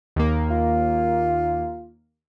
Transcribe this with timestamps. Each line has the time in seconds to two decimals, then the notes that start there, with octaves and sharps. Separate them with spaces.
0.16 D#2 A#3
0.51 F4